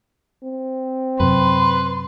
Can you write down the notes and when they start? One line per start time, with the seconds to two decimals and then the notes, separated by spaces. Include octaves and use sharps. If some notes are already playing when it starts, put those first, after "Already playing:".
0.43 C4
1.20 F#2 C3 B4 C6